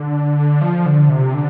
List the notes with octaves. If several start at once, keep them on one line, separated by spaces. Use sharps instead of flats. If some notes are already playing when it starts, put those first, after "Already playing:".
Already playing: D3
F3
D3
C3
D3